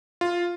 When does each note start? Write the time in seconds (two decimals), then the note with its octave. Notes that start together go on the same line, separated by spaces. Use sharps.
0.21 F4